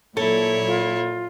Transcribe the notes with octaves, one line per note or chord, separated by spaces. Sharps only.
A#2 F#3 E4 A4 C#5
F4